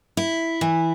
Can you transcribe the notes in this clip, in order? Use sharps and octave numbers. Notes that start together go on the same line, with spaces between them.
E4
E3